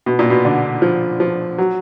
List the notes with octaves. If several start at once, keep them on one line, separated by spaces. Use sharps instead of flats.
B2
A#2
B2
D3
F3
F3
F#3